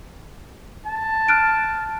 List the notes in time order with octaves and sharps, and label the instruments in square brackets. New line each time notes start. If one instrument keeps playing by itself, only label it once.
[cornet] A5
[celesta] F6 F#6 D7